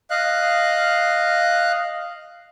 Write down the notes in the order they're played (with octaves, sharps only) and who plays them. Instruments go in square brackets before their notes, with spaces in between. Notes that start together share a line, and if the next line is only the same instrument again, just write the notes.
[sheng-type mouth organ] D#5 F5 F#6